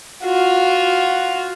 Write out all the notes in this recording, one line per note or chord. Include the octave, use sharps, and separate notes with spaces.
F4 F#4